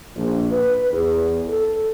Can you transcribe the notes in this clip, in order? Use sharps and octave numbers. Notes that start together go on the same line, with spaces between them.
A#1
B4
E2
A4